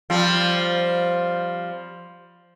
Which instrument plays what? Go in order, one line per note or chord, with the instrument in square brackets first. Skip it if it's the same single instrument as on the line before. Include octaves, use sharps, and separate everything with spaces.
[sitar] F3 G3 C4